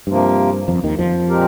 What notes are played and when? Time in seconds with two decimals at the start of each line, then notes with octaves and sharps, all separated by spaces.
0.07 G2 C3 F3 A#3
0.68 F2 F3
0.83 D#2 D#3
0.99 F2 F3
1.29 A#2 G#3 C4 G4 A#4